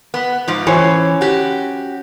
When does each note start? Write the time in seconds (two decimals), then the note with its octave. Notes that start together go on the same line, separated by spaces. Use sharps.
0.14 B3
0.48 G#2 F3
0.67 E3 C#4 C5
1.21 F#4 G4